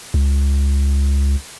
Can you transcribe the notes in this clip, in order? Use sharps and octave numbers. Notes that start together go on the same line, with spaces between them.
C#2